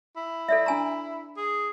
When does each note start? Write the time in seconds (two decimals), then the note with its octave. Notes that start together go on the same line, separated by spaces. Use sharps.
0.16 E4
0.49 A4 D5 E5
0.66 D4 G#5 A#5
1.37 G#4